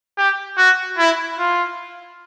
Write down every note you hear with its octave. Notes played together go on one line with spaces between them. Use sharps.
G4
F#4
E4
F4